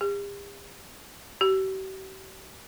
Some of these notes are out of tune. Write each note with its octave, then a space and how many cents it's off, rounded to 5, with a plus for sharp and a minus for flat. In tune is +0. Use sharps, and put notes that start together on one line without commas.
G4 +45
G4 -45